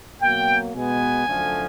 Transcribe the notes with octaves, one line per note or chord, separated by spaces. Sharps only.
B2 F#3 A#3 G5
B2 G#3 B3 G#5
F#2 D3 F3 A3